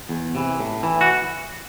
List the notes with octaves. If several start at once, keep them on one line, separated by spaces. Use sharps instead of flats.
E2
C3 E3
A2
E3
F#4